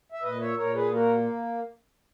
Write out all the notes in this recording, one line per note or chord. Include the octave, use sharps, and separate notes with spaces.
E5
A#2 B4 D#5
C#5 E5
A#2 A#4 C#5
G#4 B4
A#3 F#4 A#4